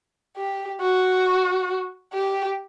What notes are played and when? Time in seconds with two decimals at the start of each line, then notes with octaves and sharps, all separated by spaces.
0.37 G4
0.81 F#4
2.14 G4